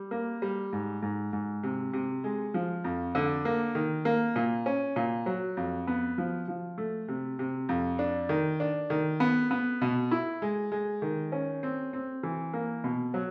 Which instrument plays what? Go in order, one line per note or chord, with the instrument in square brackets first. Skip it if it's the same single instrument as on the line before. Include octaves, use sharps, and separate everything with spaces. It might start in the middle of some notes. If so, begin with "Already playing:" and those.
Already playing: [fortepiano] G3
A#3
G3
G#2
G#2
G#2
C3
C3
G#3
F3
F2
D3
A#3
D#3
A#3
A#2
C#4
A#2
F#3
F2
B3
F3
F3
A3
C3
C3
F2
D4
D#3
D4
D#3
B3
B3
B2
E4
G#3
G#3
D#3
C#4
C4
C4
E3
A#3
B2
F#3